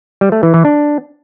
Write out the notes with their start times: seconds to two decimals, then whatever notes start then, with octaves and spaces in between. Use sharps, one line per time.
0.21 G3
0.32 A3
0.43 E3
0.54 E3
0.65 D4